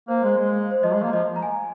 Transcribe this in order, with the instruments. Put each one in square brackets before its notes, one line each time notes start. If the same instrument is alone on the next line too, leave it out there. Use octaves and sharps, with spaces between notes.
[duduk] A#3 [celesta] C5
[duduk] G#3 [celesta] C5
[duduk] G#3
[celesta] C5
[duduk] F3 [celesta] D#5
[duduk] G#3
A#3
[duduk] F3 [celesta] D#5
[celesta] A#5
G#5